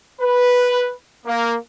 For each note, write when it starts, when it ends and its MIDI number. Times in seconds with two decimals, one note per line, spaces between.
0.21 0.93 71
1.26 1.55 58